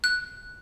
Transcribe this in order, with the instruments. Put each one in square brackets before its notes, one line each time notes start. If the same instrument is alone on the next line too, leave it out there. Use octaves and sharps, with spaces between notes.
[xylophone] F#6